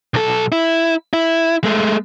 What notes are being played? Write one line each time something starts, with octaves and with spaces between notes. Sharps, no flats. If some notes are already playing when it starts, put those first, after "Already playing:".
B1 A4
E4
E4
G#3 A3